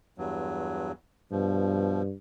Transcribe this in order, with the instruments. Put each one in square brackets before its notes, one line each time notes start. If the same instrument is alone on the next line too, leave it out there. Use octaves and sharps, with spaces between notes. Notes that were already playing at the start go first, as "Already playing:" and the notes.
[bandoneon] E2 G2 F#3
[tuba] G2 [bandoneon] B2 F3